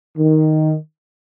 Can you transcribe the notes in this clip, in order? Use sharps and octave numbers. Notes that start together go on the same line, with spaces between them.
D#3